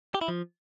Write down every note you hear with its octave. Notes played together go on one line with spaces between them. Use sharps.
G4
E4
F3